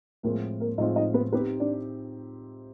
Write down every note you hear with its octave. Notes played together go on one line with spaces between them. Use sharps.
A2 F3 G#3 A#3 C4 F4 A#4
A#3 A#4
A2 F3 G#3 C4 D#4 F4 D#5
D#4 D#5
B3 B4
B3 C4 D#4 G4 B4 C5
D4 D5